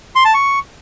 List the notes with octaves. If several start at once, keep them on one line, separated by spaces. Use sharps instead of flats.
C6
A5
C#6